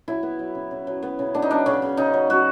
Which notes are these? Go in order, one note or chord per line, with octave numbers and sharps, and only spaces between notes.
F#3 E4
B3
F#3
C#3
C#3
F#3
B3
C#3
B3 D4
D#4
F#3 D4
C#3 C#4
C#3
C#3 D#4
F#3
F#3 F#4